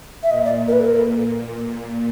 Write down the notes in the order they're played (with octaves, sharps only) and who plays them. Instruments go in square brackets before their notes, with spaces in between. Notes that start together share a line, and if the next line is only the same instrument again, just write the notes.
[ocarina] E5
[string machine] A#2 [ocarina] D#5
[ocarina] D5
A#4
B4
A4
[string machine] A#2 [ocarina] A#4